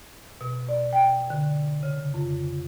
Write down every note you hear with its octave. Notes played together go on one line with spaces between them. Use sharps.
B2
D5
G5
D3
C#3
F2